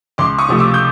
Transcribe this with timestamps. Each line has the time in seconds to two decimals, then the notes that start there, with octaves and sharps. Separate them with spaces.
0.18 C#2 C6 D6
0.39 C#6 D#6
0.49 C3 F3 A3
0.59 D6 E6
0.74 G6